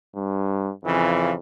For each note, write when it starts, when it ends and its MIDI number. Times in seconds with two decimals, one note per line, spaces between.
0.16 0.72 43
0.84 1.38 41
0.84 1.33 49
0.84 1.33 52